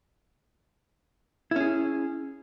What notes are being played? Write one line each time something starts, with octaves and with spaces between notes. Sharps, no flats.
C#4 E4 G#4